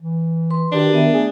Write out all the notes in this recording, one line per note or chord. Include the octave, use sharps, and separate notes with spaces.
E3
B4 C6
D#3 D4 F#4 G4 B4
D#3 B3 E5
A3 G#4